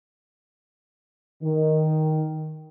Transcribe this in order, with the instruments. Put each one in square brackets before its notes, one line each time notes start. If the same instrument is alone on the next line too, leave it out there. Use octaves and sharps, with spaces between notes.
[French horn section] D#3